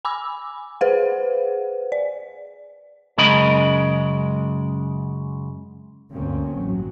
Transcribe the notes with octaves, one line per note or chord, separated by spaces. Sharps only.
G#5 B5 D6 E6
G#4 B4 C5 F5 F#5
D5
F#2 C#3 G#3 A#4 D#5 B5
D2 G2 A#3 C4 C#4
A1 F#3